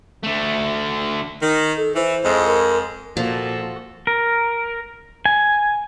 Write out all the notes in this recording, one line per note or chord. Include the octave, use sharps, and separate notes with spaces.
D3 A3
D#3
A4
E3 C5
F2 G#3
A#4
A#2 F3 F#4 A4
A#4
G#5